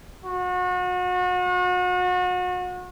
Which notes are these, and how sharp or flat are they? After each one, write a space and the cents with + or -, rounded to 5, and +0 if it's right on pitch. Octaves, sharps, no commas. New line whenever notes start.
F#4 -35